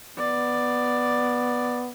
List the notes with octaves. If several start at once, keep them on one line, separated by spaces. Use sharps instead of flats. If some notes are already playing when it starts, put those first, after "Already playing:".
B3 D5